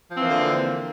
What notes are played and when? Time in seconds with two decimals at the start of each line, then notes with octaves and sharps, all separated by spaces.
0.11 F3
0.15 C4
0.19 E3
0.23 A#3
0.27 D3